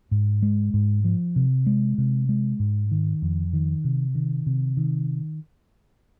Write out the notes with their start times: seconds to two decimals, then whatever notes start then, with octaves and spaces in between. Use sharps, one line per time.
0.11 G#2
0.42 G#3
0.74 G#2
1.04 F3
1.36 C3
1.67 G#3
1.98 C3
2.29 G#3
2.60 G#2
2.91 D#3
3.22 F2
3.53 D#3
3.84 C3
4.15 D#3
4.46 C3
4.77 D#3